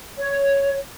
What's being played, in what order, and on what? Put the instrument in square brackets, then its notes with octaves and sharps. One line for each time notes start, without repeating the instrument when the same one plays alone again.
[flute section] C#5